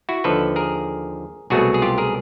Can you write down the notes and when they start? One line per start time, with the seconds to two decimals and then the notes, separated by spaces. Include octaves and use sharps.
0.09 E4 F#4
0.24 D#2 D3 F3 A4 B4
0.56 G#4 A#4
1.50 C2 B2 F#3 A3 F#4 G#4
1.74 G#4
1.82 F4 G4
1.98 G#4 A#4